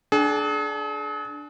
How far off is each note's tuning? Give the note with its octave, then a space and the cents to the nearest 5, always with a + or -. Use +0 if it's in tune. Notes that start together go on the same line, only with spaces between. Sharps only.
D4 +0 G#4 +40 G5 +0